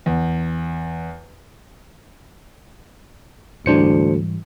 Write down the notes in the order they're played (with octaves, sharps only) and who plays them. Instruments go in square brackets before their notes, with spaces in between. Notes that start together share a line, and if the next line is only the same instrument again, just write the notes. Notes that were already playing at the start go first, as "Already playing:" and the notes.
[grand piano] E2
[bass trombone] D2 [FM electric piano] G#2 E3 G3 [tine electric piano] D4 C5 C#7